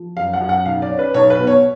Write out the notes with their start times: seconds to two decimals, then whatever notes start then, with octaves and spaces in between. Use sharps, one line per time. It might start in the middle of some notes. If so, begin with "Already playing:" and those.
Already playing: F3
0.16 F#2 F5
0.33 F#5
0.41 F#2
0.49 F#5
0.65 B1 F5
0.82 D5
0.90 C#4
0.99 B4
1.14 B1 C#5
1.30 B4
1.39 B2
1.47 C#5